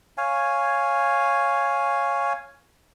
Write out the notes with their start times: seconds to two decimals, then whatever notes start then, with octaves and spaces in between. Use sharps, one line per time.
0.18 C#5 F5 G#5